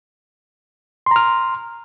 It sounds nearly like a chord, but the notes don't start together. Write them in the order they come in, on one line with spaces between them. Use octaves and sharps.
C6 A#5 F6